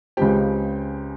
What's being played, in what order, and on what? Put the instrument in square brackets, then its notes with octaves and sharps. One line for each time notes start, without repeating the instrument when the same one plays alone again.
[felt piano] C#2 C#3 G#3 C4 G4 G5